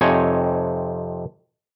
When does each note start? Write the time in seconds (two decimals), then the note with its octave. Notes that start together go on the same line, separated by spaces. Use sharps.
0.01 F2 C3 D#4 C#5 G#5